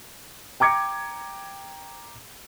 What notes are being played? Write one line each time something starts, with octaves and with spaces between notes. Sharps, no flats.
G5 A#5 D6 G#6 C#7